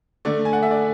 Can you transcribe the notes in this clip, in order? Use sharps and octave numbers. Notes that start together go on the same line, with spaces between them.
D3 A3 D5
G#5
F#5
E5
D5